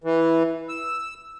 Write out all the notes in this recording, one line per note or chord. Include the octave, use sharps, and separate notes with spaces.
E3
E6